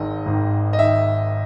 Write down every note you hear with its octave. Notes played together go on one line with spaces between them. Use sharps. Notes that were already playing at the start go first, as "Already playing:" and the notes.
Already playing: G#1 G#2 D#3 D#5
G#1 G#2 D#3
D#5
D#3 E5